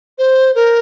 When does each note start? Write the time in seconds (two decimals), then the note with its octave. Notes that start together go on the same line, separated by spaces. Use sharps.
0.18 C5
0.55 A#4